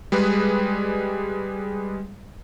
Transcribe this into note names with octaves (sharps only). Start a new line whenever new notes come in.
G3 G#3 G#4 B4